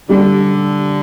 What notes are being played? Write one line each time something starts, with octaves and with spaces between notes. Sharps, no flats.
D3 G3